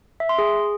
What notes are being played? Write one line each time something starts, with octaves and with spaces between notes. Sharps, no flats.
E5
C6
G#4